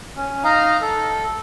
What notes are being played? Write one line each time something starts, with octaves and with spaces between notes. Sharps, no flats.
C#4
D#4 D#5 F5 A#5
A4